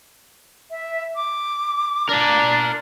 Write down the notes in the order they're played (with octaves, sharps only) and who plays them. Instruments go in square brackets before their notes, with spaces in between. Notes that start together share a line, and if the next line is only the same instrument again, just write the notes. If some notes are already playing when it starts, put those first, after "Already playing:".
[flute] E5
D6
[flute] D4 [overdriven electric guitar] A#4 D5